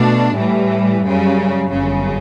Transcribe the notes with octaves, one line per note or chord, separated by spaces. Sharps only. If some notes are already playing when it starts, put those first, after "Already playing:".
Already playing: B2 A3 D4
A2 E3 G3
F#2 C#3 G3
G1 F#2 C#3